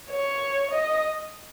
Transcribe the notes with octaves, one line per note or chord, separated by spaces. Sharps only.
C#5
D#5